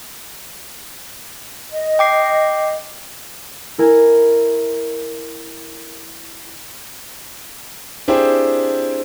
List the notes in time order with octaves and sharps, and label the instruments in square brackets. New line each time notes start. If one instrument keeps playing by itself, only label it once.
[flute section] D#5
[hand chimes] G5 D6 C7
[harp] E4 A#4 G#5
[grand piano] C4 D4 E4 G4 G#4 C5